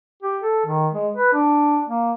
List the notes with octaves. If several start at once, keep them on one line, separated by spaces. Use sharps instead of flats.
G4
A4
D#3
G#3
B4
D4
A#3